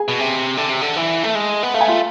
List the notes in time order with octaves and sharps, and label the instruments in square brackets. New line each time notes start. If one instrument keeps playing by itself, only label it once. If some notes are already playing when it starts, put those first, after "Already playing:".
Already playing: [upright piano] G#4 G#5
[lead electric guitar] B2
C3
D3
C3
D3
E3
A3
G#3
B3
[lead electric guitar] A3 [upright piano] F5
[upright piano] G#5
F4 F5